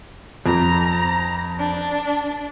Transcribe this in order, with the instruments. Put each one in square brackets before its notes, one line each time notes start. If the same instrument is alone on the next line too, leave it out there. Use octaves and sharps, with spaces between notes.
[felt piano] F2 [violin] A#5
[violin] D4